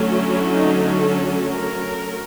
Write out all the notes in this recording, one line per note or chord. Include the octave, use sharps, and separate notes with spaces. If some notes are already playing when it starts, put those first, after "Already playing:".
Already playing: D3 F#3 A3 C#4
E4
D#4
A4
A#4